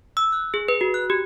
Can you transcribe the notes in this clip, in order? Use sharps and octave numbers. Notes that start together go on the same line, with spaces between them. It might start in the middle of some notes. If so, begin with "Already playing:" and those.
E6
F#6
G#4
B4
F#4
F#6
G4